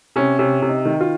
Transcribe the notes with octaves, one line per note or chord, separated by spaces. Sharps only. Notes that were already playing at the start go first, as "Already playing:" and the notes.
C3 C#4
C3 C#4
C3
D#4
D#3
F4